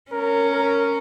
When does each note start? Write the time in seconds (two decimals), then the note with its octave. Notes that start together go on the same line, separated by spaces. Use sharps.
0.11 C#4 A#4
0.52 A#4